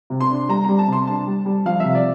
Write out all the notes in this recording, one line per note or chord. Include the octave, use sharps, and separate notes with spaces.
C3
C6
D4
G3 A#5
G3 A#5
A5
C3 C6
D4 A5
G3
G3
F3 F5
C3 E5
D5